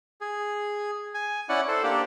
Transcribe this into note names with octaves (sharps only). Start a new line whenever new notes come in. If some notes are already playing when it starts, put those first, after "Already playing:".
G#4
G#5
C#4 E4 D5 F#5
A4 C5
A#3 D4 G4